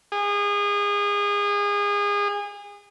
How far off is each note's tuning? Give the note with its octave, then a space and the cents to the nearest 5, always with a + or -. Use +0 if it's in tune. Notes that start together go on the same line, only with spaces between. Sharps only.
G#4 -30